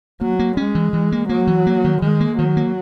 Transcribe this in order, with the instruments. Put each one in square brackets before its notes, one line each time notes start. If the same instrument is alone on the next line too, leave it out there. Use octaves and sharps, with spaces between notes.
[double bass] F#3 [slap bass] A#3
[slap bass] A#3
[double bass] G#3 [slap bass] C#4
[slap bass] E3
E3
A#3
[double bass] F#3 [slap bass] A#3
[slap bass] E3
A#3
D#3
[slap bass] D#3 [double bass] G#3
[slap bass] A#3
[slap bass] D#3 [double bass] F#3
[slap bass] A#3